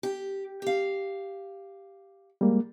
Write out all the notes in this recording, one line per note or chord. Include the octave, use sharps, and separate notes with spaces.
G4
G4 F5
G3 G#3 A#3